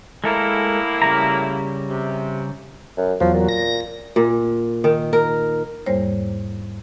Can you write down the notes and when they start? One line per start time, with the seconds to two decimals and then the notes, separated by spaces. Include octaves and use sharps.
0.24 A2 G#3 A#3 E4 A4 A#4
1.02 C#3 G3 A#5
1.89 C3
2.97 F#2
3.20 E2 F3 F#3
3.34 A#2
3.49 A#6
4.16 A#2
4.84 D#3
5.13 A#4
5.86 E2 G#2 G3 A#3 C5 C#5